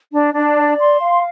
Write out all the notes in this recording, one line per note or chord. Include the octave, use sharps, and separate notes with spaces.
D4
D4
D5
C6
F5